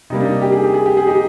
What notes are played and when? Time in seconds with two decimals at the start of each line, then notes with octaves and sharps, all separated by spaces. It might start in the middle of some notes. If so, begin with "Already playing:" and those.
0.10 C3 G3 A#3 D#4
0.20 D4
0.25 D#4
0.42 G4
0.52 G#4
0.64 G4
0.74 G#4
0.86 G4
0.97 G#4
1.07 D#4 G4